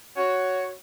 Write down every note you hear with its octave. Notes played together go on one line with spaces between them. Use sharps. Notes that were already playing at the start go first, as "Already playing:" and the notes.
F#4 C#5